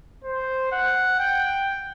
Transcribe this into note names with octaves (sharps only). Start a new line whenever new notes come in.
C5
F#5
G5